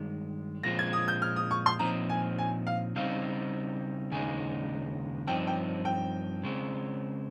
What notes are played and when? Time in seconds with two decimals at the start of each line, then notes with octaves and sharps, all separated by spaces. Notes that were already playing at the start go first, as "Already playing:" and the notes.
Already playing: G2 D#3 G#3
0.63 A#2 F3 G#3 C4 F4 A#6
0.79 G#6
0.93 D#6
1.08 G6
1.22 F6
1.36 D#6
1.51 C#6
1.66 C6
1.79 A#2 F3 C4 D#4 A#5
2.09 G#5
2.38 G#5
2.67 F5
2.96 C#3 G3 C4 D#4 F5
4.11 D#2 C#3 G#3 D#4 G#5
5.27 G2 F3 C4 D#4 G5
5.47 G5
5.85 G5
6.44 C#3 G#3 C4